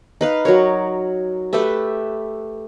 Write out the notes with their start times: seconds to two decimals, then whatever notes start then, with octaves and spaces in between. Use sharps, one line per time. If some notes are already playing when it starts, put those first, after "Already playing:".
0.21 D#4 B4 F5
0.45 F#3 A#4 C#5
1.53 A3 G4 B4 E5